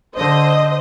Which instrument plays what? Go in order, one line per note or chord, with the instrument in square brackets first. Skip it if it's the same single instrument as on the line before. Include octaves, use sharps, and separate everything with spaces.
[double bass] D3 [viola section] C5 D#5